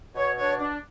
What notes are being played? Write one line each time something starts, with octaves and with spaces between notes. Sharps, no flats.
B2 C#5
D4 C#5
D4